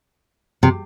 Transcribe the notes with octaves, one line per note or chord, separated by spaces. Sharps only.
C3